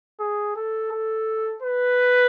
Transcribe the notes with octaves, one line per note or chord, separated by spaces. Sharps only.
G#4
A4
A4
B4